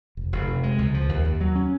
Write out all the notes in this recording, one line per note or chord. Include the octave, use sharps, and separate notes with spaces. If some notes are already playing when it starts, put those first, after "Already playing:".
F1
F1
C3
G#3
C#2
F3
D#2
D#2
F#3
C#4